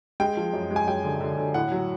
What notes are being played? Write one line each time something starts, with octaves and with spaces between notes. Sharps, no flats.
G#3 G5
F3
F#2
G#3
G#5
F#2 G5
D3
D3
D3
A2 F#5
F#3